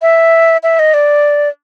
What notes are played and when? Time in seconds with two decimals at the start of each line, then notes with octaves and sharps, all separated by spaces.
0.02 E5
0.63 E5
0.79 D#5
0.94 D5